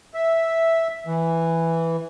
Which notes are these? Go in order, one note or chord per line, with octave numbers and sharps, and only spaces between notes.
E5
E3